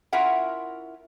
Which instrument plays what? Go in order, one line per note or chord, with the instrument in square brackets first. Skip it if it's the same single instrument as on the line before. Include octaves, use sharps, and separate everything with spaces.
[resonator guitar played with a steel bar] C#4 E4 F4 A#4 E5 F#5